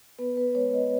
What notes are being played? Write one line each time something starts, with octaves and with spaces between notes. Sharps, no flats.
B3 B4
B4
G#3 C#5
D#5